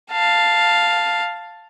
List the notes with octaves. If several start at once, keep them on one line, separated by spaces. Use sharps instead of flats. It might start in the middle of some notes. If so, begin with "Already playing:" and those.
F5 A5